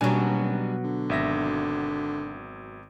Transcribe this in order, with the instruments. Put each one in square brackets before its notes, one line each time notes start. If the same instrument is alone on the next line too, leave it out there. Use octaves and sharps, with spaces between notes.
[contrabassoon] D#1 [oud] B2 F#3 [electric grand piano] G3 D4 G#5
[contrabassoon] D3
[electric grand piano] G#1 E5 A#6